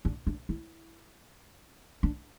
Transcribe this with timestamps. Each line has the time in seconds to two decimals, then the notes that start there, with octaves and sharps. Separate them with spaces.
0.05 D4
0.27 D4
0.49 E4
2.03 D4